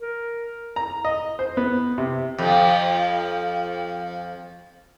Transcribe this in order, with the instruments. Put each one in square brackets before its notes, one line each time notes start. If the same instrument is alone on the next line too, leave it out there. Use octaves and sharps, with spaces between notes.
[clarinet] A#4
[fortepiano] A#5
D#5
C5
B3
C3
[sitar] F2 F3